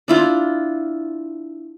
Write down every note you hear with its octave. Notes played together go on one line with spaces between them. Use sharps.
D4 E4 F4